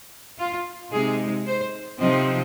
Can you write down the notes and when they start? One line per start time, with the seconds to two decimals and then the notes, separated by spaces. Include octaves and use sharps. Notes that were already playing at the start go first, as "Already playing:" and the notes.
0.39 F4
0.92 C3 G#3 D#4 G#4
1.46 C5
2.00 C3 F3 C4 D#4 D#5